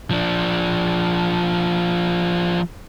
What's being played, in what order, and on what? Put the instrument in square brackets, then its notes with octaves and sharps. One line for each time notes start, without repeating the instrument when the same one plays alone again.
[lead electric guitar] F3 D4